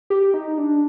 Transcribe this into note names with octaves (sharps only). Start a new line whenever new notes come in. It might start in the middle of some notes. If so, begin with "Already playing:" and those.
G4
D#4
D4